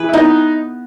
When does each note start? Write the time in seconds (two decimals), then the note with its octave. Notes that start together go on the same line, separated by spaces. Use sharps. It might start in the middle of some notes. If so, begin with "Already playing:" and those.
Already playing: E3 G#4 B4
0.09 E4
0.13 B3 D#4